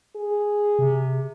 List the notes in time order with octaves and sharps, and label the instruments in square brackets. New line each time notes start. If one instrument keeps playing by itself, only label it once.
[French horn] G#4
[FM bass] C3